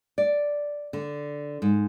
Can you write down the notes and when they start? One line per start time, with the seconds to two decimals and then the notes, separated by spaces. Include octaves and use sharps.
0.18 D5
0.93 D3
1.62 G#2